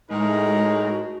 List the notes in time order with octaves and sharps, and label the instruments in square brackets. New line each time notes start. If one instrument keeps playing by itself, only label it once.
[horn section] A2 A#4 [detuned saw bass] G#3 [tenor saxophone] D#4
[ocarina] F#4